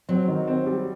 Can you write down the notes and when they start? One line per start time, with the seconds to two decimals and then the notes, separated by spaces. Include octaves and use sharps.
0.09 F#3 C4
0.28 D#3
0.47 C4
0.66 G3